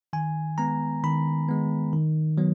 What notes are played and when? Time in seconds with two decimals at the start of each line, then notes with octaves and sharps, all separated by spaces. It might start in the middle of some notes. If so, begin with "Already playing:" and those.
0.13 D#3 G#5
0.58 G#3 B3 A#5
1.04 D#3 B5
1.49 G#3 B3
1.93 D#3
2.38 F#3 B3